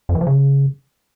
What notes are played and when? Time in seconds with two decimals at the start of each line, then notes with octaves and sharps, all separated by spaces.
0.09 F2
0.15 E3
0.21 F3
0.27 C#3